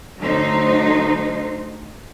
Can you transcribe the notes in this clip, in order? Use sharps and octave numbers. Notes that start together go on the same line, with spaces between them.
D3 F#3 A3 D#4 C5